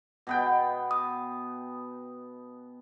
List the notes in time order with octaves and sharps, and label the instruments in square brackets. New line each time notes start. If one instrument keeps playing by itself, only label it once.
[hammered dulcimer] B2 B3 G5
[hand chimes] D#6